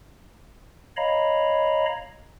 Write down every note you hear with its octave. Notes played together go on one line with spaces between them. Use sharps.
C#5 D#5 F5 A#5 B5